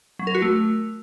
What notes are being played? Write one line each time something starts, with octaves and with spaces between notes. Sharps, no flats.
F#3
A#4
F#4
A3